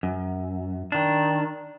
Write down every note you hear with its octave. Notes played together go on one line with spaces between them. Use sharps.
F#2
D#3 D4